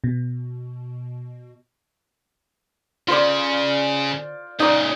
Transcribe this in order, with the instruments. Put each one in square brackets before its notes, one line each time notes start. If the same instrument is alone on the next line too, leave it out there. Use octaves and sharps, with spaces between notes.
[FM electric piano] B2
[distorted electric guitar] C#3 [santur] F4 C5 D5
[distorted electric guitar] C#2 A#2 [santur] D#4 D5